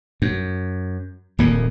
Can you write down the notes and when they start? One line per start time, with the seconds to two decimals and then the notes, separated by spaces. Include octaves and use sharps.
0.22 F#2
1.39 D#1 F2 A#3